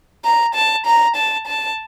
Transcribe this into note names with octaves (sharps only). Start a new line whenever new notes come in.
A#5
A5
A#5
A5
A5